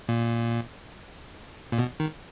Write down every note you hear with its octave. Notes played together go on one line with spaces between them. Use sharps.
A#2
A#2
B2
D#3